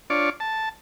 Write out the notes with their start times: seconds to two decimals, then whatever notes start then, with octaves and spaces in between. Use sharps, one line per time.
0.10 D4 F4 C#5 D5
0.40 A5